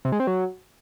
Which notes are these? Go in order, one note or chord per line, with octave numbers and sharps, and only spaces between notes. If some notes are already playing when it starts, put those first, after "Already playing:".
C3
G#3
C4
F#3